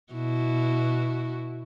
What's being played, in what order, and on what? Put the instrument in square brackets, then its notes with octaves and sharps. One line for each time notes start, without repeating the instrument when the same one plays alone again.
[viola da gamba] B2 E4 F#4